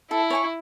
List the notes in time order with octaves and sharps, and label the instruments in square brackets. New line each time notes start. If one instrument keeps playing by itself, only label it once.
[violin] E4 [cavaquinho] A4
[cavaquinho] C#5 G#5 C#6